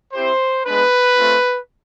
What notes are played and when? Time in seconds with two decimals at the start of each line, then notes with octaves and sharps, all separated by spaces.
0.13 C4 E4 G4 C5
0.65 G#3 B3 D4 B4
1.18 A3 C4 F4